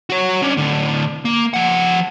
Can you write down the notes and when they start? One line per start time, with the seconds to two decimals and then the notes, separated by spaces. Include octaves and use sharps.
0.10 F#4 C#5
0.42 C#4 D4
0.57 A2 D3
1.25 A#3
1.54 F3 F#5